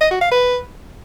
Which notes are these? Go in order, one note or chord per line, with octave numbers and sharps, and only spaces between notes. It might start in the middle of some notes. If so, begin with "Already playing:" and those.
D#5
F#4
F5
B4